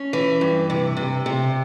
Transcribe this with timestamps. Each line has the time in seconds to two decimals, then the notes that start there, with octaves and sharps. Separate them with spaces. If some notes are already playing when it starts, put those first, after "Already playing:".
Already playing: C#4
0.13 E3
0.41 G2
0.70 C3
0.97 C3
1.26 C3